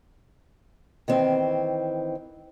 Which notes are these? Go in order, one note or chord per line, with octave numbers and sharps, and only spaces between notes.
D#3 E3 C4